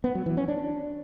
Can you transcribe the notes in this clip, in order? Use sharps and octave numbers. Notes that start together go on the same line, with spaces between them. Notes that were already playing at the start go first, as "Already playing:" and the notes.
B3
F#3
E3
C#4
D4